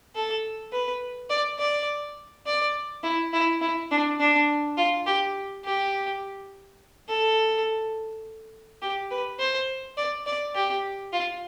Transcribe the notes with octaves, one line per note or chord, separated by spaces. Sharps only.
A4
B4
D5
D5
D5
E4
E4
E4
D4
D4
F4
G4
G4
A4
G4
B4
C5
D5
D5
G4
F4